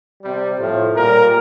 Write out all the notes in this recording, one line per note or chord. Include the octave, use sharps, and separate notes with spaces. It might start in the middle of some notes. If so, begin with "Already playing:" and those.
C3 G3
A2 F3
A#2 G3 A#4